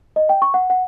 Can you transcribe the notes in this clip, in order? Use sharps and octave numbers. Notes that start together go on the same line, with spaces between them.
D#5
G5
C#6
F#5
F#5